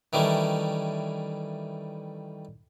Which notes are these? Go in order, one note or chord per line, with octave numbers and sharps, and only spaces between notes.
D#3 E3 G3 A3 C#4